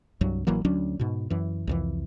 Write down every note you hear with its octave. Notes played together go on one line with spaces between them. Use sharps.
C2 G2 F#3
A1 E3 F#3 A#3
D2 F#3 C#4 D4
G#2 B2
F#2 E3
C2 F2 E3